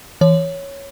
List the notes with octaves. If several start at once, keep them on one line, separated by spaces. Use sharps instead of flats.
E3 C#5